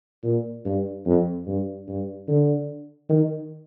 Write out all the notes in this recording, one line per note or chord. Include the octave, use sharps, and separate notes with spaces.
A#2
G2
F2
G2
G2
D3
D#3